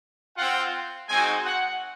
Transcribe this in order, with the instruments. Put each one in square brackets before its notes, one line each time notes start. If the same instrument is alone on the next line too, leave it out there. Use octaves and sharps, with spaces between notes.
[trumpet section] C4 F4 F#5
G#3 C4 D#4 F#4 G#5
F#5